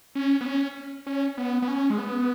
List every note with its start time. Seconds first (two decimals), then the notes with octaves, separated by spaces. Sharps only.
0.15 C#4
0.41 B3
0.46 C#4
1.07 C#4
1.38 B3
1.62 B3
1.68 C#4
1.90 G#3
1.98 B3